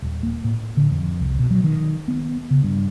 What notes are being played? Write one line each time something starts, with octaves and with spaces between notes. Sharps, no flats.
D#1
A#3
A2
D3
F2
C2
B2
F#3
D#3
B3
C#3
G2